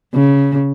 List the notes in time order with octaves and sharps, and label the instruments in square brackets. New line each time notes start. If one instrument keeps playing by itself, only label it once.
[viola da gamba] C#3